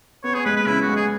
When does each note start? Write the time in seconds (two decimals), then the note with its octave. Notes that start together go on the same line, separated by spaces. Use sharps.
0.24 B3 C#5
0.34 G#4
0.45 G#3 B4
0.57 B4
0.66 C#3 E4
0.82 F#4
0.89 G#3
0.96 G#4